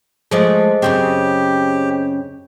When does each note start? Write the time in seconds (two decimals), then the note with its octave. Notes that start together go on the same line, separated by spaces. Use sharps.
0.31 F3 G#3 A3 G#4 C5 D#5
0.82 F#2 C#3 C4 G4